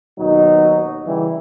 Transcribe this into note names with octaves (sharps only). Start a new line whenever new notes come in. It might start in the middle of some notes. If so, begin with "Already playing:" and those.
D#2 B2 F#3 C#4 D#4
C#3 E3 G3